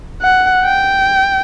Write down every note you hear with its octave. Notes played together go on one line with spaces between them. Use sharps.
F#5
G5